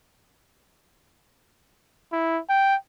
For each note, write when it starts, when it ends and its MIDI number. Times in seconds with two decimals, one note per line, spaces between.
2.12 2.40 64
2.49 2.75 79